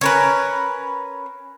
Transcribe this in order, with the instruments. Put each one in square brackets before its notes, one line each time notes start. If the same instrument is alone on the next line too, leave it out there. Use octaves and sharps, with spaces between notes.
[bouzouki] C#4 A#4 B4